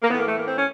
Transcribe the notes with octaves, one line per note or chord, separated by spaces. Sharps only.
A#3
A2 E3 B3
A#3
A3
A#3
C4
C#4